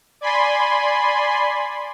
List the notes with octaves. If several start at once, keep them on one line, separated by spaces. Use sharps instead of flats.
D5 G#5 B5 C6